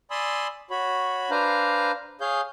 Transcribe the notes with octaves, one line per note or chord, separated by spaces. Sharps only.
D5 G#5 B5 C6 D#6 E6
F#4 C#5 B5
D4 B4 C5 F5 A#5
G#4 C#5 F5 G6